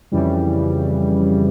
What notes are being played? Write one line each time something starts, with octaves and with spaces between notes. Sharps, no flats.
F2 C#3 E3 G3